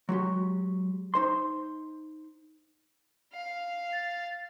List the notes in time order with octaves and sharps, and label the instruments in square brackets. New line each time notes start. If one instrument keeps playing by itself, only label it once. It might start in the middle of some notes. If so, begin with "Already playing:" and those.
[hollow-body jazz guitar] F#3 G#3 F#4 G4
D#4 C5 C6
[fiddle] F5
[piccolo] A6